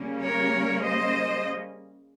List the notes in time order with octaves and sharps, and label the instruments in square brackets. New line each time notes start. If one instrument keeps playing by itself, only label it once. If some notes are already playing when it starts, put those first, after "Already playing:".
Already playing: [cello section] C#3 G3 A#3 C#4
A#4 C#5
C5 D#5